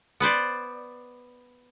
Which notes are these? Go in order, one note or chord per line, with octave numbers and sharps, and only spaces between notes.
B3 B4 C5 D5